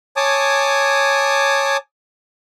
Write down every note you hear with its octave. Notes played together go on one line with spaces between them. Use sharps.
C#5 G#5 A5 D6 D#6